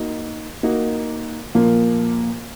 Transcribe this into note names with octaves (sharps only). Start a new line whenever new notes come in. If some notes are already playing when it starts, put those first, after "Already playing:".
Already playing: A#3 D#4 F#4
A#3 D#4 F#4
A#2 F3 A#3 F4